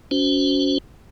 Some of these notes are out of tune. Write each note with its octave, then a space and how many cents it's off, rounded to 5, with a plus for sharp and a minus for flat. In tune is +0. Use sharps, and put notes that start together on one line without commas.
C#4 +30 F#4 +0 C5 -15